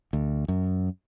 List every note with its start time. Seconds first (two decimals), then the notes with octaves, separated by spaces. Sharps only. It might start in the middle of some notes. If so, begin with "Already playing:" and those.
0.13 D2
0.48 F#2